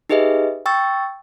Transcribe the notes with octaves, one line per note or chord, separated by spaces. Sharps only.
D#4 G4 G#4 B4 D#5 E5
G5 C#6 E6 A6